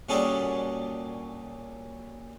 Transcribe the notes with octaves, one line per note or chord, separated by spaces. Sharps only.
A#2 G3 C#4 F#4 G#4 A4